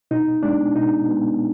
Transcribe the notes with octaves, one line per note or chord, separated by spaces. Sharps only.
B2 D#4
G#3 B3 D4
B2 D#4
G#3 B3